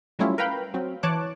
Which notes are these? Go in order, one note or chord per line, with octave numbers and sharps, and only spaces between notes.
F#3 G3 A3 C#4 E4 F4
A#4 B4 F5 G5 B5
F#3 C4
E3 C#5 A5 D6 F#6